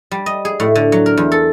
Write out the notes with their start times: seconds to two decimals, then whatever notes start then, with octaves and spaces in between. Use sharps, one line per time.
0.11 G3
0.26 D#5
0.45 G#4
0.60 A2
0.75 D3
0.92 F#3
1.06 A#4
1.17 E2
1.32 A4